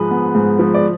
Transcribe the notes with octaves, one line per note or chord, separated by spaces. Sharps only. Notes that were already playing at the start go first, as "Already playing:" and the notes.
Already playing: G#2 F3 G#3 B4
B3
G#2
F3
D5